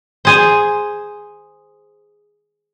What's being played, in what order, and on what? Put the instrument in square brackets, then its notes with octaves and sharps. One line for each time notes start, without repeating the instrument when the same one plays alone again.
[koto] G#4 C5